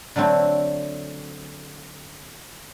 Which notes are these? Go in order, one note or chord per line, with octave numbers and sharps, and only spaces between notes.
D3 F#3 A3 C4 E4